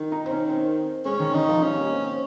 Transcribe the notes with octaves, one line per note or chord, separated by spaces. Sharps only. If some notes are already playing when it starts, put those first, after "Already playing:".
Already playing: D#3
D#4
C4
C#4
C4
G#3 C#4
D#3
D#3 D#4
F3
G3 C#4
A#3
C4
C4